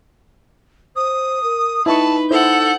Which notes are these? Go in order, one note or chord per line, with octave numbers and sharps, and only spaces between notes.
C5 D#6
A#4
D#4 E4 B4 D#5 A5 C#6
E4 A4 C5 F#5 G6